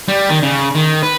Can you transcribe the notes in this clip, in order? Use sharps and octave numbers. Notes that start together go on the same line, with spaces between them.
G3
D#3
C#3
D#3
B4